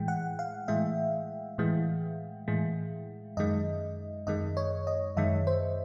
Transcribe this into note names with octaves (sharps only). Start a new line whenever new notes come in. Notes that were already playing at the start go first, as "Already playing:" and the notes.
Already playing: A2 E3 G#3 G5
F#5
F5
A2 E3 G#3 E5
A2 E3 G#3
A2 E3 G#3
F#2 D#3 G#3 D#5
F#2 D#3 G#3 D#5
C#5
D#5
F#2 D#3 G#3 E5
C5